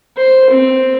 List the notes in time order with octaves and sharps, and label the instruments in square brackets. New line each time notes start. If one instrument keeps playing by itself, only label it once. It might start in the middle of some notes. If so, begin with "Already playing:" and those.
[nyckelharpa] C5
C4